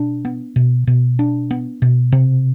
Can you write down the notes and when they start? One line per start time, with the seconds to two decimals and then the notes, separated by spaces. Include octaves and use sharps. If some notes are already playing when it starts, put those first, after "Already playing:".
Already playing: B2 D4
0.25 B3
0.56 B2
0.87 B2
1.19 D4
1.51 B3
1.82 B2
2.12 C3